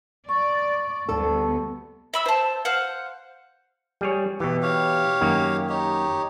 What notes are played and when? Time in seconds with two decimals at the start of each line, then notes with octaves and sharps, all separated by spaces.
0.29 D5 C#6
1.09 D2 G3 B3 A4
2.14 E5 B5 E6
2.26 C5 A5
2.65 C5 F5 F#5
4.01 G3 G#4 C#5
4.40 B2 E3 G4
4.62 G4 C#5 F5
5.21 F#2 D#3 A#3
5.69 D#4 G4 C#5